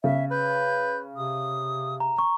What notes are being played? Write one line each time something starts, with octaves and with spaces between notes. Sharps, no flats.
C#3 E5
B4 G6
C3 D#6
A#5
A#5 C#6